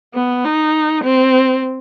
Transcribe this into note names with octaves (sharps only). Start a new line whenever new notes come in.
B3
D#4
C4